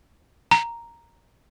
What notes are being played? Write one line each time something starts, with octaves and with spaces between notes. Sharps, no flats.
A#5